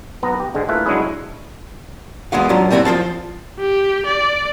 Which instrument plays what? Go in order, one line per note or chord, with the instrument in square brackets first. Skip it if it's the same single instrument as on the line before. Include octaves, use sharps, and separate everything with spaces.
[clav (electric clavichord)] B1 B3 A#5
G4
G#2 D3 G#3
A3 A#3 E4 F4 B4
F#3 G#3 C#4 D4 E4 G#4
[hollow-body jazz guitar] E2 G#3 B3 F#4 F5
F#3 C#4 D4 F4
G3 A3 C4 D4 E4 F#4
F3 F4 C5 A5
[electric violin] G4
D5